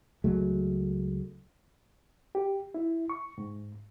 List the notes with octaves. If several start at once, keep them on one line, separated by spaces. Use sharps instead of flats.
C#2 F#3 G#3 A3
G4
E4
C#6
G#2